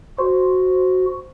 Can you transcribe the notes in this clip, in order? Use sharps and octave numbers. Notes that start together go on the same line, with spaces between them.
F#4 C5